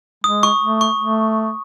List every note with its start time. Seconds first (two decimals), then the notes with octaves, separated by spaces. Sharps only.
0.24 G#3 D#6
0.43 C#6
0.62 A3
0.81 C#6
1.00 A3